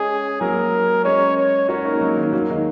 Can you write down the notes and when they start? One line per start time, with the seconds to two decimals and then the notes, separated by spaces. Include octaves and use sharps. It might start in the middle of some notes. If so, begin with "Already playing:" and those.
Already playing: G#3 C#4 G#4
0.41 F#3 A#3 A#4
1.05 G#3 C#4 C#5
1.37 C#5
1.69 C#4 F#4 A#4
1.85 A#3 D#4
1.93 G#3
2.01 F#3 A#3
2.17 D#3 G#3
2.33 F#3 A#3
2.50 D#3 G#3